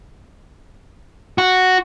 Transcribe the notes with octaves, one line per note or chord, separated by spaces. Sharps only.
F#4